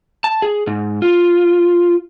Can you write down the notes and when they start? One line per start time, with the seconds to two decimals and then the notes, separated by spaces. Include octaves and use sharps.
0.24 A5
0.42 G#4
0.67 G#2
1.02 F4